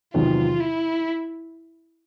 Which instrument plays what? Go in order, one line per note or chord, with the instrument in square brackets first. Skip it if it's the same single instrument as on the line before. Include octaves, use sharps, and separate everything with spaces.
[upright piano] E2 C3 D#3 F#3 B3 [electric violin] F4
[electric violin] E4